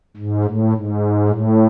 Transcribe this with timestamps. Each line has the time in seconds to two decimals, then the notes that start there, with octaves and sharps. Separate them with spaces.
0.17 G#2
0.44 A2
0.73 G#2
1.28 A2